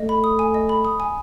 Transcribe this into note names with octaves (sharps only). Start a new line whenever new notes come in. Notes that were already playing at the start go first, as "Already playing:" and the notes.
Already playing: A3 D#5
B5
D#6
G#5
D#5
B5
D#6
G#5